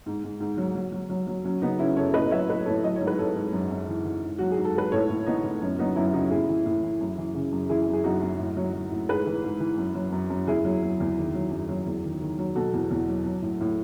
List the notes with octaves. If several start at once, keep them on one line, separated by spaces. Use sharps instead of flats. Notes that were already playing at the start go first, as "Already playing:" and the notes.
G#2
G#2
G#2
F#3
F#3
F#3
F#3
F#3
F#3 C#4
C#3 B3 D#4
C#3 C#4 E4
F#2 A4 C#5
A2 B4 D#5
D#5
F#3 C#5 E5
A2 B4 D#5
A2 A4 C#5
F#3 D#5
G#2 C#5
B4
G#2 A4 C#5
G#2
F#2
F#2
E3
E3
G#2
F#3 F#4
G#4
G#2
A4
G#2 B4
A2 A4 C#5
A2
E3 B3 D#4
A2
F#2 C#4
F#3 B3 D#4
F#2 C#4 E4
C#3 D#4 F#4
A2 E4 G#4
E3
A2
E3
F#2
E3
C#3
F#2
E3 E4 G#4
F#2
G#4
F#2 D#4 F#4
F#2
A2
F#3
F#3
A2
G#2 G#4 B4
E3
G#2
E3
F#2
F#3
F#2
F#2
E2 E4 G#4
F#3
F#3
E2
D#3
F#3
F#2
F#3
E2
D#3
D#3
F#3
B2 F#4 A4
E2
E2
F#3
F#3
A2
A2